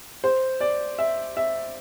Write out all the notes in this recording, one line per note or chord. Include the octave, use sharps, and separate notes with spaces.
C5
D5
E5
E5